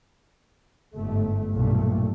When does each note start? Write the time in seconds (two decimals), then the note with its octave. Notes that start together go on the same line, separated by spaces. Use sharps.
0.96 G1 G#2 A3
1.54 B1 G2 A#2 A3